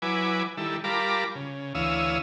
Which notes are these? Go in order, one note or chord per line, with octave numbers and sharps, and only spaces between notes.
F#3 E4 B4 G#5 D6
D#3 G3 E4 A4
G3 F4 A#4 A5 B5 D6
C#3
D2 E3 C#5 F5 D#6 E6